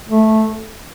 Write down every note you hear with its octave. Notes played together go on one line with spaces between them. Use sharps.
A3